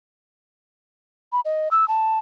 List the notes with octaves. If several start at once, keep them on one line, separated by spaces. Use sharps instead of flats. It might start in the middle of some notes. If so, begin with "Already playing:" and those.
B5
D#5
E6
A5